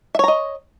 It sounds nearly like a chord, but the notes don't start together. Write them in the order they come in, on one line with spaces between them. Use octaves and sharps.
E5 C#5 A#5 D#5